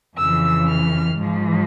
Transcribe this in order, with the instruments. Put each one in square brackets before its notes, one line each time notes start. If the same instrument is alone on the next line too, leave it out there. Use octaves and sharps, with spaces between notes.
[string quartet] F2 C#3 E3 E6
F6
G#2 F3